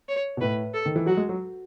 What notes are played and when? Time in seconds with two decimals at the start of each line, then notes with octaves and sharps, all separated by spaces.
0.09 C#5
0.37 B2
0.41 A2 B4
0.74 A4
0.86 D#3
0.96 E3
1.06 F#3 F#4
1.17 G#3
1.29 F#3